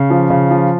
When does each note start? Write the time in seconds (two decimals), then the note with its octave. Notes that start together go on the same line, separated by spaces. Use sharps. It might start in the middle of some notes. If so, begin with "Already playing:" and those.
Already playing: C#3
0.10 F3
0.30 C#3
0.51 F3